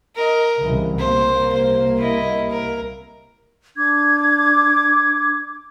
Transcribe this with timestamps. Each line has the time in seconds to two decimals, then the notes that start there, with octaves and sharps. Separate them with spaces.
0.16 A#4 D#5
0.64 C2 C#3 E3
0.98 C2 A#3 C5
1.53 C5
1.99 E4 D#5
2.51 A#4
3.76 D4 D6 G#6